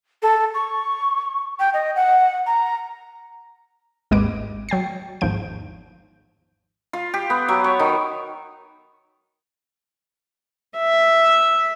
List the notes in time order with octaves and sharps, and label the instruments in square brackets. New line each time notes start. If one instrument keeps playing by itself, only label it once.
[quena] A4
C#6
G5
D#5
F#5
A#5
[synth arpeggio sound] G#1 D#2 G#3 B4 D6 D7
F#3 G5 A6 C7
G#1 E2 G#2 F3 G6 D7
[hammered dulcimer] F4
G4
B3
F#3
C#5
D#3
[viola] E5